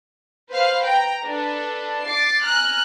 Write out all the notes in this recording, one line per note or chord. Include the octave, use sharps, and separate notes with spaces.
B4 C5 F5
G5 A#5
D4 A4 B4
D6 A6 C7
G#5 A#5 F6 F#6